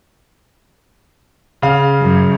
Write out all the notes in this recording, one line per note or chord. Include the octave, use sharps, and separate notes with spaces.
C#3 F5
F#2